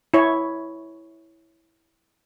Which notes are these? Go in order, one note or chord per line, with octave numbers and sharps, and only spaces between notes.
E4 C#5